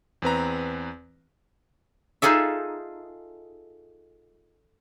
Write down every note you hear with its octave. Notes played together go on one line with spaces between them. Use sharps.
E2 C4 B4 A#5
D#4 F4 G#4 A4 E5